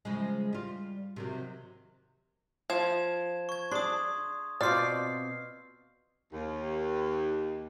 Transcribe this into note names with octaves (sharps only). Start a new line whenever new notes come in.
C#3 F3 G#3
G3 F4
C3 D#3 F#3
F3 G#6 E7
C#6 G#6
D4 G#4 C6 D#6
B2 C4 F4 D5 F6 C7
D#2